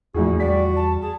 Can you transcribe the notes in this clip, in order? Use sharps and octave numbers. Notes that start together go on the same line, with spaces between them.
A#1 E2 A2 F#4 G#4
G3 F#4 D5 B6
A5
G#4 A5